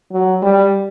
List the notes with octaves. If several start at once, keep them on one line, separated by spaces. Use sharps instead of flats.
F#3
G3